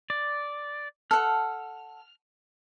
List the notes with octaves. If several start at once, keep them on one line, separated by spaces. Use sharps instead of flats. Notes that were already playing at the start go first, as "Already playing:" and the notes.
D5
A4 F#5 F6